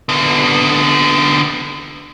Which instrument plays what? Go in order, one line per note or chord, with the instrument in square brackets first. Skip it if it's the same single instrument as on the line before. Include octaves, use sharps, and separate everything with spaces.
[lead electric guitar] D3 B3